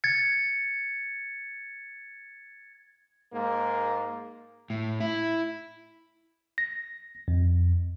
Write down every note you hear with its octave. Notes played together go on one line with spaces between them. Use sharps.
G#6 A6 C#7
G#2 A#3
A2
E4
A#6
F2